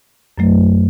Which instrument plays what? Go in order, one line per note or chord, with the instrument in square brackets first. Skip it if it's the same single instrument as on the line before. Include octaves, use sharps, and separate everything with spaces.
[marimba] F#2 F#3 A3